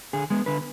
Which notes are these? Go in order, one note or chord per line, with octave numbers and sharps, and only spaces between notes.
D3 G#4
G#3 B3
D3 B4